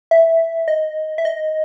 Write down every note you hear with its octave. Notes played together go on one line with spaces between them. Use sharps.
E5
D#5
E5
D#5